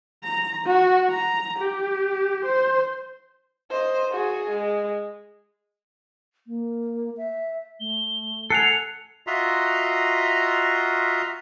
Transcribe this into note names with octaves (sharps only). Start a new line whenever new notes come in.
A#5
F#4
A#5
G4
C5
C5 D#5
F#4 G#4
G#3
A#3
E5
A3 G7
A4 F#5 G#5 C7 F7
F4 F#4 D#5 E5 A#5 C6